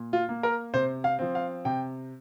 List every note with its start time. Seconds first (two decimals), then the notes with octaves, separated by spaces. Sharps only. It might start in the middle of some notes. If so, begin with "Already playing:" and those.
Already playing: A#2
0.13 F4
0.29 A#3
0.43 A#4
0.74 C3 C5
1.04 F5
1.19 F3 C4
1.35 F5
1.65 C3 G5